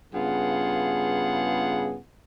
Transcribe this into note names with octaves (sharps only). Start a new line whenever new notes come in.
G2 C#3 B3 F4 G#4 F#5